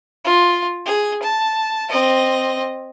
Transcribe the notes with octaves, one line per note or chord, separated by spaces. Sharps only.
F4
G#4
A5
C4 D#5